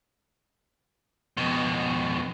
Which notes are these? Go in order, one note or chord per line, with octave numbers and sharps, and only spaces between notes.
F2 B2